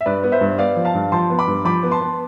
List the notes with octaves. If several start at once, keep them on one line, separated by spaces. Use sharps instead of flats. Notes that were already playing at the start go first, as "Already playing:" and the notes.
E5
G2 B4 D5
B3
C5 E5
G2
B3 D5 F5
F3
F5 A5
G2
F3 A5 C6
B3
B5 D6
G2
F3 B5 D6
B3
A5 C6
B3